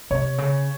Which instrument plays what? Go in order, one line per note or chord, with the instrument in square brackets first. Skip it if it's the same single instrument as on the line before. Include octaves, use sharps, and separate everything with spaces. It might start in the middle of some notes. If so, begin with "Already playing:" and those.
[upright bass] C3 [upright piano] C#5
[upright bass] C#3